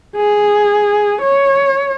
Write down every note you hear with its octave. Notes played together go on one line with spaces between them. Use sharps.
G#4
C#5